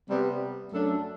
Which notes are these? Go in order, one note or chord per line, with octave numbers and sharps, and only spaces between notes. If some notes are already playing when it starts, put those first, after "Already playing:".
C3 G3 B3
F#2 F#3 A3 D4 A4